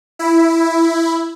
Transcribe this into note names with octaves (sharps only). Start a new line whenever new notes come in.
E4